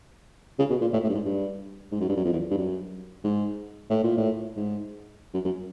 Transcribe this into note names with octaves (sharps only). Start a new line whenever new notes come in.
C#3
B2
A#2
A2
A2
G2
G#2
G2
G#2
F#2
G2
F#2
F2
E2
G2
F#2
G#2
A2
A#2
A2
G#2
F#2
F#2